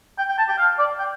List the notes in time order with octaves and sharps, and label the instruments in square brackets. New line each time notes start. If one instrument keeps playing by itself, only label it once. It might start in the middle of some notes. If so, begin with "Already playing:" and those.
[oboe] G5
G5
A5
G5
F5
D5
G5